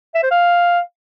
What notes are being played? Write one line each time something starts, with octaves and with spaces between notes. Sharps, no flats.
E5
C5
F5